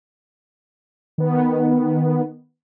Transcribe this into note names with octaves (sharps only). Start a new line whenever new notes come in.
D#3 B3